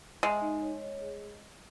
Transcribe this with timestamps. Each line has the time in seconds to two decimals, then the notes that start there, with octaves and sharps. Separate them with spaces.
0.22 G#3 E5
0.42 D#4
0.62 C#5
0.81 C#5
1.01 G#4